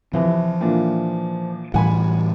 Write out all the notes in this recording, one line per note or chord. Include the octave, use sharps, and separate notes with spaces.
C2 E3 F3
A#2 E3 D4
A2 E3 G3 F#5 G#5 B5